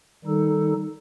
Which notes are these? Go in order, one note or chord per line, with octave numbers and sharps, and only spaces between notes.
D#3 G3 D#4 A4